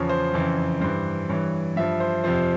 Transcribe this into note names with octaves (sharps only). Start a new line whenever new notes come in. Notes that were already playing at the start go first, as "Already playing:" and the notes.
Already playing: E2 C#3 F3 C#5
C5
F2 C#3 E3
G2 E3 C5
G2 E3 C#5
G2 F3 E5
C5
F2 C3 F3 C5